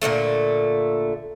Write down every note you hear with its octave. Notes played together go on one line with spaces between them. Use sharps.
A#2 D3 E3 A3